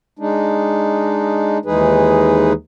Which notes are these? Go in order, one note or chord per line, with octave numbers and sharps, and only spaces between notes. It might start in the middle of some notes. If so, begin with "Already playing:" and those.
G#3 D4 D#4
D#2 E3 G#3 D#4 G#4 B4